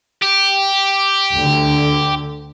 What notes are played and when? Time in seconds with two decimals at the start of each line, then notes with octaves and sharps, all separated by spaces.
0.22 G4
1.35 D2 D3